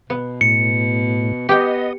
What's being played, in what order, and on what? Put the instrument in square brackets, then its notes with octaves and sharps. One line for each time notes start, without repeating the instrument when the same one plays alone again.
[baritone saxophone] B2 [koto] B3
[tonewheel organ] A2 [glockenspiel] C#7
[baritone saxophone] B3 [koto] G4 G5 [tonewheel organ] D#5